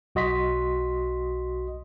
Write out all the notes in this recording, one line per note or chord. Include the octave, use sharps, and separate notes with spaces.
B1 F#4 D#5 C6 B6